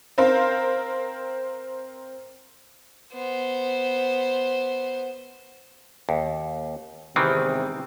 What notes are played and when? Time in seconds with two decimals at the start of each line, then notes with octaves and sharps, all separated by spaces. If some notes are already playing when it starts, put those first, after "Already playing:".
0.18 C4 A#4 C5 F5
3.13 B3 C5
6.09 D#2
7.16 E2 G#2 C3 D#3 E3 C4